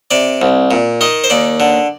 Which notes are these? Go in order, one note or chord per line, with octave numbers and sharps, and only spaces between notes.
C3 D5
C2
A#2
D#3 D#5
C5
D#2 D5
D3